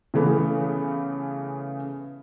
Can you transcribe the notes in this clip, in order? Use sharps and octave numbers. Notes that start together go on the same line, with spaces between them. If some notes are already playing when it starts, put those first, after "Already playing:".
C#3 E3 A3 B3